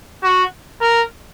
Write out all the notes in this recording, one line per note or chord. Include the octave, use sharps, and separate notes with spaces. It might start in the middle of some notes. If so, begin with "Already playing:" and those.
F#4
A#4